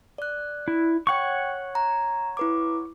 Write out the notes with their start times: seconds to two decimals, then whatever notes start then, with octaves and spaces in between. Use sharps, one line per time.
0.18 D5 F#6
0.68 E4
1.07 C#5 F#5 G5 C#6 C#7
1.75 A#5
2.37 E4 B4 D6